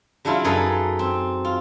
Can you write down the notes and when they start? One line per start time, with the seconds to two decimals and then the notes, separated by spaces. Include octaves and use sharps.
0.25 C#3 F#3 D4 E4 F4
0.44 F#2 D#4 G#4 A4 B4
0.99 C4
1.45 F4